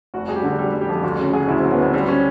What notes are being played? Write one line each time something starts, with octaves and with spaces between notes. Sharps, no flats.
F1 F#4
G3 G#4
G4
D3
G3
G3
G4
F2
D2 F#4
C#3
F#3 G#4
D2 E4
C4
F#3
B3
D2 C4
G3 C4
C#4